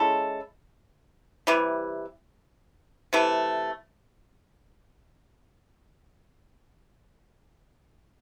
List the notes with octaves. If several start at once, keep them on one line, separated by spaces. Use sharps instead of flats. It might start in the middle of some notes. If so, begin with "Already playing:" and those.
Already playing: G#3 C#4 E4 A4
C3 E3 G3
C3 E3 A3